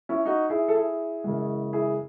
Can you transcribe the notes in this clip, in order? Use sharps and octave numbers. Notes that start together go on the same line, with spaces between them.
C#4 E4
D#4 F#4
E4 G#4
A4
E4 G#4
F#2 C#3 E3 G#3
E4 G#4